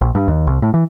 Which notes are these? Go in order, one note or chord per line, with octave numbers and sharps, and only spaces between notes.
A#1
G2
D#2
C2
A2
E3